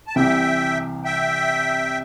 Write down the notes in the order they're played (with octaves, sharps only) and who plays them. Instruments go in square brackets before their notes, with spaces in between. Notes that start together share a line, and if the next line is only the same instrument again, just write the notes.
[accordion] A5
[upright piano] C2 C3 E3 [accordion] E5 G5
[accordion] E5 G5